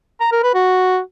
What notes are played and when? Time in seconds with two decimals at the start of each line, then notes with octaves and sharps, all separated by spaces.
0.20 A#5
0.32 A#4
0.43 B4
0.54 F#4